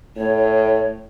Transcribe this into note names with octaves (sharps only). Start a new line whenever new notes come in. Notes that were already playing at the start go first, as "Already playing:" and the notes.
A2 C#5